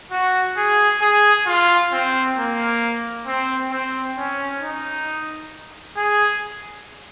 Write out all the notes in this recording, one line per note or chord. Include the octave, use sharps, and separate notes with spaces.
F#4
G#4
G#4
F4
C4
A#3
C4
C4
C#4
D#4
G#4